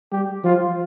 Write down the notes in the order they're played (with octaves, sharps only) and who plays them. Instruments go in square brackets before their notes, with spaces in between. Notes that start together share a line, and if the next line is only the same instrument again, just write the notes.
[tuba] G3 [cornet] G4
[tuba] F3 [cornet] F4